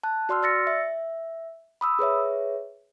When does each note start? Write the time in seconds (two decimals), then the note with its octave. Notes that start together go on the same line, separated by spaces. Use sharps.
0.03 A5 F#6
0.29 F#4 D5 C6 E6 F6
0.42 D5 E6 A6 A#6 C#7
0.67 E5
1.81 B5 D#6 E6
1.99 G#4 B4 C#5 E5